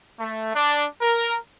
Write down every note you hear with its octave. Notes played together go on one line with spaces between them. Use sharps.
A3
D4
A#4